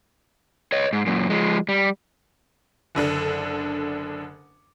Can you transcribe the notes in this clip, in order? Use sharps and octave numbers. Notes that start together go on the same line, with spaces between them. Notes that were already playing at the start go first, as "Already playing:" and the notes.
C#5 D#5
G#2
F#2 A#2
F3 G#3
G3
F#1 D3 D4 A4